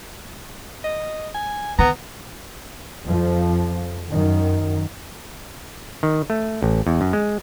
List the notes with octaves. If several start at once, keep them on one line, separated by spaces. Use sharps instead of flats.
D#5
G#5
D3 B3 A#5
F2 F3
F#2 D#3
D#3
A3
A1
E2
F#2
G#3